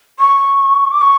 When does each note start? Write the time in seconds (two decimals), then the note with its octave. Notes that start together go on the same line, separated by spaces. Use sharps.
0.19 C#6
0.91 D6
1.01 C#6